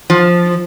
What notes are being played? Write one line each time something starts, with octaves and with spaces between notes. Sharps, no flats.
F3